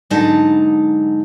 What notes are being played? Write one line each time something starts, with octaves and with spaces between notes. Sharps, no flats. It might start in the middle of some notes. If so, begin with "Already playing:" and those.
G#2 D3 F#3 D#4 A5